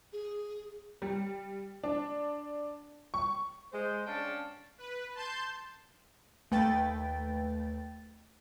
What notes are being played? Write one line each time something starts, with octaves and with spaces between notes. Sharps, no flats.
G#4
G3
D4
C#6
G#3 C5
C#4 D4 F5 G5 A5
B4
A5 C6 G6
D#2 A3 B4 G5 A6